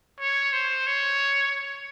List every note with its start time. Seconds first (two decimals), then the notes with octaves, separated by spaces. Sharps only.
0.20 C#5
0.53 C5
0.87 C#5